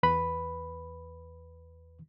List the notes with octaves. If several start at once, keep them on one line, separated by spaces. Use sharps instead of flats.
E2 B4 B5